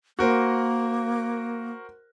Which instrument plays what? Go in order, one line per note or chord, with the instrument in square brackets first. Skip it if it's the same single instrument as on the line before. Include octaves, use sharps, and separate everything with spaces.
[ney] A#3 [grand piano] F#4 A#4 C5